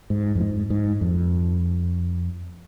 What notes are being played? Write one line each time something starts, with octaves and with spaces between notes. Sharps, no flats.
G#2
F2
G#2
G#2
F2